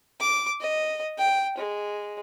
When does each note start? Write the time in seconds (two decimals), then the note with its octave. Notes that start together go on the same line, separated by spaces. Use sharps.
0.20 D6
0.61 D#5
1.18 G5
1.58 G#3